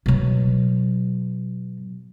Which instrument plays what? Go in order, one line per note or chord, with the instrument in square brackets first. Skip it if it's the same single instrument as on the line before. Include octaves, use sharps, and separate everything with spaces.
[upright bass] B2 F#3